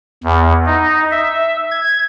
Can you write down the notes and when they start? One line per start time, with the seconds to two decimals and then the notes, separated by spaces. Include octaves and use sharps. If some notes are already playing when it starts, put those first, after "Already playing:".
0.24 E2
0.66 D#4
1.11 E5
1.71 G#6